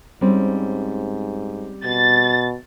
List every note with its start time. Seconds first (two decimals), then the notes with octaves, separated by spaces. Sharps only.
0.21 G#2 G3 C4 C#4
1.85 B2 A6